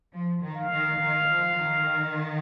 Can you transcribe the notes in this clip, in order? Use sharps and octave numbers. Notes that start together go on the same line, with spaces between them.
F3
D#3
F5
D#3
D#3
F3
D#3